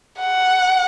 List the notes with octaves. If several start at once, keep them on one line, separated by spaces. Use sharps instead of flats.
F#5